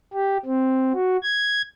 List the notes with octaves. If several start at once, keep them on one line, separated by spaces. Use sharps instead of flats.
G4
C4
F#4
G#6